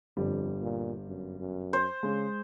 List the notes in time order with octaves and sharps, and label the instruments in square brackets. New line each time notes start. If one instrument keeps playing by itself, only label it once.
[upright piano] G1 G3 [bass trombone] F2
[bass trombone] A#2
F#2
F#2
[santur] C5
[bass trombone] C#3 [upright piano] G#3